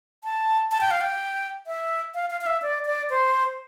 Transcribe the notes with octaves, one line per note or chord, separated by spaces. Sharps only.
A5
A5
G5
F5
G5
E5
F5
F5
F5
E5
D5
D5
C5